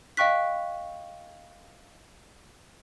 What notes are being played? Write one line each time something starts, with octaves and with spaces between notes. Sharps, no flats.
D#5 F5 G5 C#6 F#6 B6